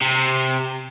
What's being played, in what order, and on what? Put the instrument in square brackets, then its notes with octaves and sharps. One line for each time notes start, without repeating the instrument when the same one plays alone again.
[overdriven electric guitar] C3